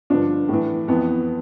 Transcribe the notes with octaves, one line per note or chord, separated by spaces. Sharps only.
G2 D3 F3 D4
A2 E3
F2 E3 B3